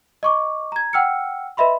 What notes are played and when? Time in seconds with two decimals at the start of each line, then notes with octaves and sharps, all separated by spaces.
0.23 D#5 C#6 D6
0.72 A#5 G#6
0.93 F#5 G5 E6 F6 C#7
1.57 B4 D#5 E5 B5 C6